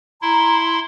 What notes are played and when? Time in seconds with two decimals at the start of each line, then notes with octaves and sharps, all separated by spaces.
0.22 E4 A#5 C6